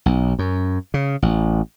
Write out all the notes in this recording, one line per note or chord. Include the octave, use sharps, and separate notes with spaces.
B1
F#2
C#3
A1